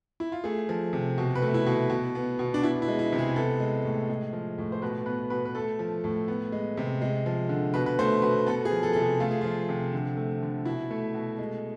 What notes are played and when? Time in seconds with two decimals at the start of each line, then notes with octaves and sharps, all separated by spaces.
0.20 E4
0.32 F4
0.44 A3 G#4
0.69 F3
0.93 C3
1.18 B2
1.35 B4
1.42 A3
1.54 E4
1.66 B2
1.90 B2
2.15 B3
2.39 B2
2.54 D4
2.63 B3 E4
2.82 E4
2.88 G#3
2.99 E4
3.12 C3
3.18 G#4
3.36 B3 A4
3.60 G#3
3.84 A2
4.10 G#3
4.33 F3
4.58 A2
4.72 C5
4.82 B2 B4
5.06 B3 B4
5.30 B2 B4
5.45 B4
5.55 A3 A4
5.79 F3
6.04 A2
6.28 B3
6.52 G#3
6.77 C3
7.02 G#3
7.26 F3
7.49 D3
7.74 B2 B4
7.86 B4
7.99 A3 C5
8.22 B2 B4
8.46 B3 A4
8.65 G#4
8.71 F3
8.83 A4
8.93 C3 A4
9.02 G#4
9.20 A3 F4
9.31 G#4
9.41 F3 F4
9.69 C3
9.93 D3
10.17 A3
10.42 D3
10.65 B2 E4
10.91 A3
11.14 B2
11.38 G#3